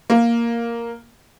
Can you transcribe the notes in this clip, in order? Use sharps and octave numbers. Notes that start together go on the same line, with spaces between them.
A#3